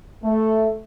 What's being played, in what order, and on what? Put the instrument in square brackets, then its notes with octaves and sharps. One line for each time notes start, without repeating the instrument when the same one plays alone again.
[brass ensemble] A3